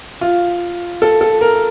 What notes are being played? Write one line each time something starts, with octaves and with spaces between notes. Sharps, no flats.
F4
A4
A4
A#4